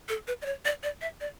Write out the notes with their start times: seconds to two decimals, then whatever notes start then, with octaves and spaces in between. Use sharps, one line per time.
0.09 A4
0.28 B4
0.42 D5
0.46 C#5
0.65 D5
0.83 D5
1.01 E5
1.21 D5